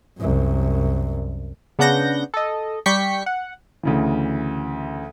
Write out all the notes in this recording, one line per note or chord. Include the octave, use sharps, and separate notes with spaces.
C2 F#2
C#3 B3 D4 F#5 G6 A#6
A4 D#5
G3 G4 C#6 G6 B6 C#7
F#5
D2 C#3 E3